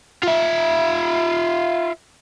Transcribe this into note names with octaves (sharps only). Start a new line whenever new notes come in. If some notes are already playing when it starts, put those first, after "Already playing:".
F4 E5